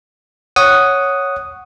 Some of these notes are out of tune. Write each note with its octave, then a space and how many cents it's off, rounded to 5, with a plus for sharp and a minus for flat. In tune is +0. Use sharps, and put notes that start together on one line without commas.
C#5 +0 F#5 +0 D#6 +0